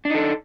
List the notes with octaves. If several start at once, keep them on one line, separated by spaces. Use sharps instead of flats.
D4 D#4 A4